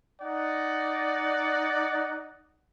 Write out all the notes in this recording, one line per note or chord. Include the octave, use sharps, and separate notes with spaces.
D#4 D5 F#5